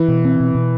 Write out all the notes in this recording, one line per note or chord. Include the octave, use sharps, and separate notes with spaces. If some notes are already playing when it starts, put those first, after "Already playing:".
Already playing: E3
B2
C4
B2
B2